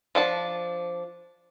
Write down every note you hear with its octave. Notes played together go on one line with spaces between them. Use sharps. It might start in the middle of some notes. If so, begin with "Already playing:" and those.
F3 D4 A5